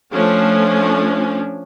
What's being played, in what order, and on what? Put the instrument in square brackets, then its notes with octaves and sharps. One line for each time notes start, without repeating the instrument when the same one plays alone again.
[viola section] F3 A3 C#4 D4